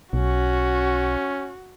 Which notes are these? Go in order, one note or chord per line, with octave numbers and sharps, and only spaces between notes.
B1 C#4 F#4